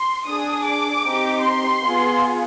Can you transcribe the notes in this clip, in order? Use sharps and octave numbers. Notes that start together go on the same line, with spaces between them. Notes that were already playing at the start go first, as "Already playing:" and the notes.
Already playing: C6
D4 G#4 D#6
D6
C4 D#4 G4
C6
B3 F4 G#4